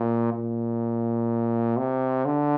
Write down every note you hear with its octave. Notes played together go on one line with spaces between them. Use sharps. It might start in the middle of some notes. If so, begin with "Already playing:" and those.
Already playing: A#2
A#2
C3
D3